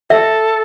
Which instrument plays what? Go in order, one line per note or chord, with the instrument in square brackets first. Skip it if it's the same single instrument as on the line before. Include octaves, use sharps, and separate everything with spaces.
[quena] A4 [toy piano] E5